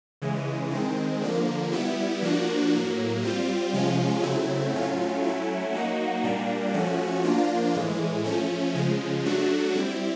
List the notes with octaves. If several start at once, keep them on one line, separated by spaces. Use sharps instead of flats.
C#3 E3 G#3
D#3 G#3 C4
D3 F3 A#3
G3 B3 E4
F3 A#3 D4 F#4
A2 F#3 A#3
G3 C4 F4
C3 F3 G#3 C#4 F4
C#3 F#3 A3 C4 E4
A2 F#3 A3 C#4 F4
F#3 A3 C#4 E4
F#3 A#3 D#4 F#4
A#2 G3 A#3 D4
F3 A3 C#4 F#4
F3 A#3 D4 F4
A2 E3 G#3
F3 A3 C#4
C#3 F3 G#3
F#3 A3 D4 F#4
G3 C4 E4